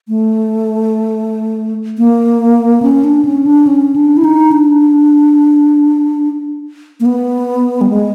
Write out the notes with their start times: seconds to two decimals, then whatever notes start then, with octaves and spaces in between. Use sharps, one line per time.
0.08 A3
1.98 A#3
2.82 C#4
3.04 D4
3.25 C#4
3.46 D4
3.67 C#4
3.96 D4
4.17 E4
4.24 D#4
4.52 D4
7.00 A#3
7.06 B3
7.81 G3
7.90 G#3